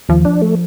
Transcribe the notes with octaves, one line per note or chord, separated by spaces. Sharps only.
D#2 F3
D4
A3